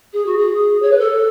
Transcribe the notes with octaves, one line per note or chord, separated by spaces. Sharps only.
G#4
F#4
G#4
C#5
B4
A4